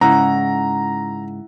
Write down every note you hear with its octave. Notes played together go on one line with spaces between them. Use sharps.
G#2 C#3 E4 F#5 A#5